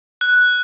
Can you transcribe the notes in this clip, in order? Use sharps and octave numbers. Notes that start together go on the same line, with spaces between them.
F#6